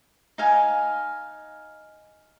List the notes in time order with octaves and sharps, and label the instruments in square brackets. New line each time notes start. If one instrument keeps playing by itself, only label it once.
[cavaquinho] D#4 F5 G#5